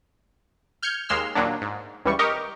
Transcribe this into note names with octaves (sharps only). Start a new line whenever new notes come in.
F6 G6 G#6 C#7
D#2 G#3 C6 E6 F6
D#2 A#2 F#3 D4
G#2
C#2 E3 G3 C#6
G4 A#4 D#5 C#6